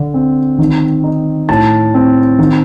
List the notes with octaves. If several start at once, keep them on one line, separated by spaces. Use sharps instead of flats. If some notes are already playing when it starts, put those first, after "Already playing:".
Already playing: D3
C4
D#3
D#4
A2 A5
C4
D#3